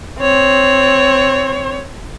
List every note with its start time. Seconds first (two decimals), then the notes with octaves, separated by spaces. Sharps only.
0.20 C4 C#5